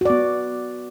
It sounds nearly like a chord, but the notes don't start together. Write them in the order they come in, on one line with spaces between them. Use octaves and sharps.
F#4 D5 B3